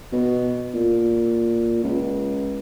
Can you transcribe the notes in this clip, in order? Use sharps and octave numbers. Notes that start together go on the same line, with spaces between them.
B2
A#2
C#2